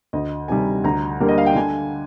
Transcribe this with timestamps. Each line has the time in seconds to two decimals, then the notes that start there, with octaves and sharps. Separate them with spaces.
0.13 D2 D#5
0.48 C3 D#3 G3 G#5
0.84 D2 A#5
1.20 D3 G3 A#3
1.29 D#5
1.38 F5
1.46 G5
1.55 D3 G#5